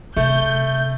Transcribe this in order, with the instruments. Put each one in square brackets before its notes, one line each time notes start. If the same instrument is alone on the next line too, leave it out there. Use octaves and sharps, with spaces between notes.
[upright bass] C3 [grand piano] A3 [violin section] G6